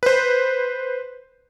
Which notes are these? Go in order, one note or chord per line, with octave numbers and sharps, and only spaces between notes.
B4 C5